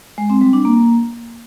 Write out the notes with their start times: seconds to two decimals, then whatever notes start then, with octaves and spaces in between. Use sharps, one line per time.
0.18 G#3
0.30 C4
0.41 G3
0.53 D4
0.65 A#3